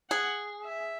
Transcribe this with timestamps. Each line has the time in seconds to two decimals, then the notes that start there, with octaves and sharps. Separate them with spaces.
0.10 G#4 F#5
0.64 E5